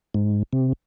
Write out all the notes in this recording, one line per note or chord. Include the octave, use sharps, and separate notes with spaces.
G#2
C3